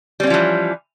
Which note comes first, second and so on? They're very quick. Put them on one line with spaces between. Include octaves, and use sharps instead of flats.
G3 C4 C#4 F3 E3